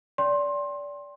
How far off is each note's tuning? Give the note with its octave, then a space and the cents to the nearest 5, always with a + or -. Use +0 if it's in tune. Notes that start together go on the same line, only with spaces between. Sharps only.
D5 -25 G5 +10 C6 +20